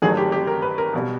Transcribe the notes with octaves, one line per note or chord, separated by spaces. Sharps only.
G1 G2 D#3 F#3 A3 G#4
G4
G4
A#4
B4
A#4
B1 B2 G3